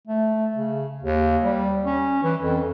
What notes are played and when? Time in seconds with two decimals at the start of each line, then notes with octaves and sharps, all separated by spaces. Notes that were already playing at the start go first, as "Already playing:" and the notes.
0.07 A3
0.55 C#3
1.03 D#2
1.44 G3
1.86 C#4
2.23 E3
2.41 F2